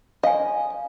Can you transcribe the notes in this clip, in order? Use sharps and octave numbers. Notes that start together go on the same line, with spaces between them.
D#5 F5 G#5